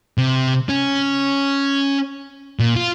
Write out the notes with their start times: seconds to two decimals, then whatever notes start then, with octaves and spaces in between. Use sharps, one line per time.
0.18 C3
0.69 C#4
2.59 A#2
2.76 F4